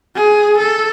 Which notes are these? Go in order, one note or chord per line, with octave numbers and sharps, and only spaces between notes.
G#4
A4